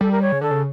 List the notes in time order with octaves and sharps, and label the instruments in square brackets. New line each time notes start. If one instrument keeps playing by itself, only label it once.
[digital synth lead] G3 [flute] A4
[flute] A#4
C#5
[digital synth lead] C#3
[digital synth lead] D3 [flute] A4
[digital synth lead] C#3